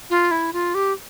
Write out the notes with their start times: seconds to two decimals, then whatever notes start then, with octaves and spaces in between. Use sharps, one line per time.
0.10 F4
0.31 E4
0.53 F4
0.75 G4